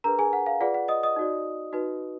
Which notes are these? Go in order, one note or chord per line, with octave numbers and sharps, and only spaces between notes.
D4 G#4 A#4 B4 A#5
G#4 G#5
F#5
F5
F4 G#4 B4 D5 F#5
F#5
D#5 D#6
D#5 D#6
D#4 F#4 D5
D#4 F#4 B4